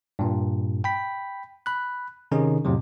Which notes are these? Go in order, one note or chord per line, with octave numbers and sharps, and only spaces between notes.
G2 A#2
G5 B5 B6
B5 F#6
C3 D#3 C#4 D#4 G#4
F2 A2 C3 F#3